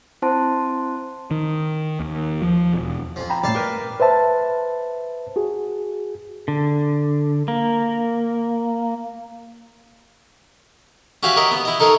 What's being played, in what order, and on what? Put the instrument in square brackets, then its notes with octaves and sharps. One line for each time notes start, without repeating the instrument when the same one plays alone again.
[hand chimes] C4 E4 C5 A5 C6
[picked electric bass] D#3
D#2
F3
E1
[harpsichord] F2 F3
[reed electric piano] G5 A#5 B5
[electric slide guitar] F2 A2 [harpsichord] D5 F5 A5
[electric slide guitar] G4 A#4 B4
[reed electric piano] B4 C5 E5 A5
F#4 G#4
[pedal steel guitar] D3
A#3
[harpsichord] C#4 F#4 G4 E5 F5 G#5
G4 A#4 C#5 D#5 E5 F#5
B3
E4 D#5
D#4 A4 A#4 C#5 C6